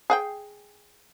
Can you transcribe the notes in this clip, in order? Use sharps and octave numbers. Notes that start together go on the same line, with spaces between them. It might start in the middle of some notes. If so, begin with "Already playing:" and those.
G#4 F#5 G5